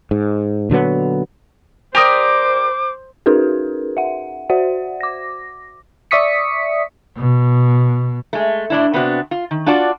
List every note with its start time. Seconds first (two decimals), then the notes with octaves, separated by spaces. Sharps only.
0.11 G#2
0.70 A#2 D3 F#3 B3
1.95 G4 A#4 C5 D5 D6 D#6 D7
3.26 C#4 D#4 F#4 G#4 A#4 B4
3.97 E5 F#5
4.50 F#4 C5 D5 E5 F#5
5.01 D6 A#6
6.11 D5 E5 C#6 D#6 B6 C#7
7.18 B2
8.33 G#3 A3
8.70 A2 D4 E4
8.93 C3 B3 C4 D4 F#4
9.31 F4
9.51 D#3
9.66 D4 F4 F#4 D5 A5